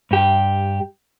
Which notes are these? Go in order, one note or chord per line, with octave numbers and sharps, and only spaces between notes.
G2 G4